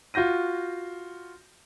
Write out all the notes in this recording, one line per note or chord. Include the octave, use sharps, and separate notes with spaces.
F4 F#4 G6 A#6 D#7